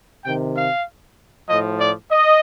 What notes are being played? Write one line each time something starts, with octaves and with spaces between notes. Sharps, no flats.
C3 D#3 G5
F5
A2 F3 D#5
D5
D#5